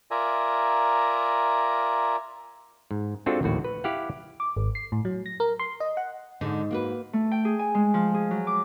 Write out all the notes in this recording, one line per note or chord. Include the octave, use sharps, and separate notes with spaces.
F4 A#4 D5 E5 G#5 A#5
G#2
G#3 C4 D4 F4 F#4 A4
A#1 D#2 A2 F#4
B4
E4 G4 F5 F#5
D6
G#1
C7
A2
F#3
A#6
A#4
C6
D#5
F#5
G#2 D3
A#3 F#4 B4
A3
G5
G#4
G#5
G#3
F3
G#4
F#3
D6